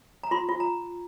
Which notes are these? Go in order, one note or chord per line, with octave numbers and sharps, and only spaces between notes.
A#5
F4 C6
F4
A#5